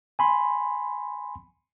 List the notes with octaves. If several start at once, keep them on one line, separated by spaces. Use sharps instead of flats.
G#5 B5 C6